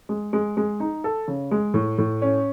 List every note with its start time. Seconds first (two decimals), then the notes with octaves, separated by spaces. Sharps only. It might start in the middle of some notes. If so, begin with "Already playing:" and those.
0.09 G#3
0.33 G#3
0.57 G#3
0.80 D#4
1.04 A4
1.28 C#3
1.51 G#3
1.74 A2
1.98 A2
2.22 C#4